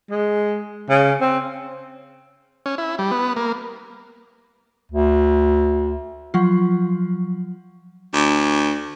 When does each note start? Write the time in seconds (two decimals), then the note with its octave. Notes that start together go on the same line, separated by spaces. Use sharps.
0.10 G#3
0.90 C#3
1.21 C4
2.66 C#4
2.78 E4
2.99 G3
3.11 B3
3.36 A#3
4.92 D2
6.34 F3 F#3 F4
8.13 D2